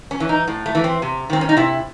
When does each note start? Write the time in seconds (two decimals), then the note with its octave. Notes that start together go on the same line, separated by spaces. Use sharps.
0.11 C#4
0.20 E3
0.29 D#4
0.48 A2
0.66 A3
0.75 E3
0.84 C4
1.02 C3
1.30 D#3 C4
1.41 C#4
1.49 D#4
1.57 C3 E4